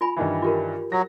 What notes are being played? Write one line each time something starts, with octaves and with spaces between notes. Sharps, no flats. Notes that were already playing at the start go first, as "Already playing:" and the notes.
F4 G#5 B5
G2 D#3 E3
F4 G4 A#4
F#3 A#6